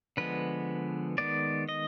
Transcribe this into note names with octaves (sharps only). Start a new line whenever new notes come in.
D3 F3 G#3 B3 B4
D#3 G#3 B3 D5
D#5